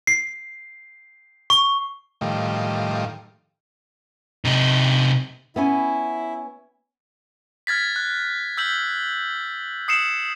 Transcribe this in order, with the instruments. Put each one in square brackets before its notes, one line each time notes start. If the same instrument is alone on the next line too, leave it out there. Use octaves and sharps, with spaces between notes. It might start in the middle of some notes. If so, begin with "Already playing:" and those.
[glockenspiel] C7
C#6
[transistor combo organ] A2 D#3 F3 G3
[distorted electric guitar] C3 D#4
[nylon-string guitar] B3 C#4 G#5 [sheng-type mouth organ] E4
[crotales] F6 G#6 A6 B6
F#6
E6 G6 B6 F#7
D#6 C7 C#7 E7 F#7